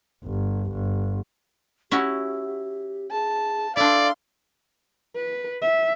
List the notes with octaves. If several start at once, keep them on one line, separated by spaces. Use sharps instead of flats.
G1
G1
C#4 E4 F#4 G4
G#4 A5
D4 E4 A4 D5 F5 C6
B4
E5